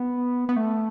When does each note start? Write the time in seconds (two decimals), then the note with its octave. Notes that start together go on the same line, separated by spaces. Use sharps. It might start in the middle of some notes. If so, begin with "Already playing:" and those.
Already playing: B3
0.49 B3
0.56 A3